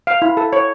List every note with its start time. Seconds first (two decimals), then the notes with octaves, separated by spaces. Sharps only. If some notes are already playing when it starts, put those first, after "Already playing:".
0.07 F5
0.22 E4
0.37 A4
0.53 C#5